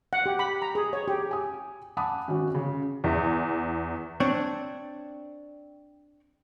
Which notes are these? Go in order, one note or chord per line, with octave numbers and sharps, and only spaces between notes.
F#5
G4
B5
A#5
G#4
C#5
G4
G#5 D#6
F#5 G#5 A5 B5 D6 D#6
G#1 C#4 F#4
C#3
E2
C4 D4 C#5